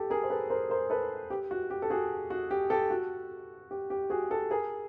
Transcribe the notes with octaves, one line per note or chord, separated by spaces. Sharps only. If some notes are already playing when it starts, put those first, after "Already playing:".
Already playing: G4 A4
G#4 A#4
C5
A4 B4
A#4 C5
A#4 C5
A4 B4
G4
F#4
G4
A4
F#4 G#4
F#4
G4
G4 A4
F#4
G4
G4
F#4 G#4
G4 A4
G#4 A#4